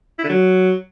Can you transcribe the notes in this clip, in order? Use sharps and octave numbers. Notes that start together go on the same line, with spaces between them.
E4
D3
F#3